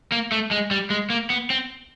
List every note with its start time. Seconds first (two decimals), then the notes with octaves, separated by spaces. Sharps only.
0.12 A#3
0.32 A3
0.51 G#3
0.71 G3
0.90 G#3
1.10 A#3
1.30 B3
1.50 C4